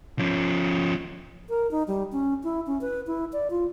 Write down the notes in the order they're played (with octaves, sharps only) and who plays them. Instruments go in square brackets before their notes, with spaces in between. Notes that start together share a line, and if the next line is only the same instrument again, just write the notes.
[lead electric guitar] F3 C#4
[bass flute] A#4
D#4
G3
C#4
E4
C#4
B4
E4
D5
F4